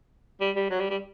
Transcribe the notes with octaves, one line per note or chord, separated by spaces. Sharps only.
G3
G3
F#3
G3
G3